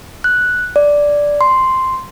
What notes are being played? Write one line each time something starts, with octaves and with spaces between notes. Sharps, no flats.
F#6
D5
C6